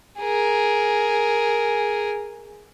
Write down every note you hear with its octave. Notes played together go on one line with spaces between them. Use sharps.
G#4 A#4